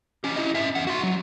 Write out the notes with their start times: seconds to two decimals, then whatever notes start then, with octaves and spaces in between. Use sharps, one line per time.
0.24 C#4 G4
0.36 E4 D#5
0.54 C#4 E5
0.75 E2 F#5
0.87 F#4 C6
1.03 F#3